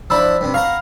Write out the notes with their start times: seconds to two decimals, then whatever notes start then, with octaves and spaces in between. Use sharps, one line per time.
0.10 F3 D4 E4 B5 E6
0.41 G2 C3
0.54 F5 F#5 A#5 C#6